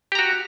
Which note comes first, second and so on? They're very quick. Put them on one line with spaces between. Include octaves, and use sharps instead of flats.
G4 A#5 F#4